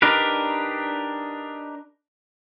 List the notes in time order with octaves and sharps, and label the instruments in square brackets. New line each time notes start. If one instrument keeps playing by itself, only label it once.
[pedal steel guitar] D4 D#4 G4 A#4 B4